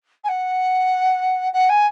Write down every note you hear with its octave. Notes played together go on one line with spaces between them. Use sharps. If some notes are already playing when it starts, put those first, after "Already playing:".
G#5
F#5
F#5
G#5